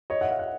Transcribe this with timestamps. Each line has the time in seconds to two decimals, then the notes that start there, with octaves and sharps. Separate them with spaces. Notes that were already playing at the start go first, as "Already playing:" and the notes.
0.10 C#5 D#5
0.21 E5 F#5
0.31 F5
0.39 F#5